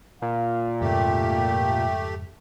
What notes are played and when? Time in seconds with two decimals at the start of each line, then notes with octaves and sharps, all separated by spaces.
0.22 A#2 F5
0.81 F2 G#2 C#3 A3 G4 G5